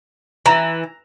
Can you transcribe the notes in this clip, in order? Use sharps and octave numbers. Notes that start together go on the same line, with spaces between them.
E3 A#5